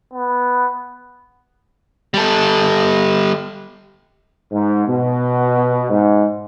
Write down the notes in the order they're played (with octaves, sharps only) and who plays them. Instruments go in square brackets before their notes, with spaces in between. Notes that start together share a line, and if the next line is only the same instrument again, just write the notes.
[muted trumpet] B3
[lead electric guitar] G3 A4
[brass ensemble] G#2
B2
G#2